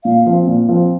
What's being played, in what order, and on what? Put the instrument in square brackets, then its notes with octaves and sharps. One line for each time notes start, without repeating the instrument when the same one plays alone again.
[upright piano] A#2 [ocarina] F5
[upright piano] F3 C4
A#2
F3 C4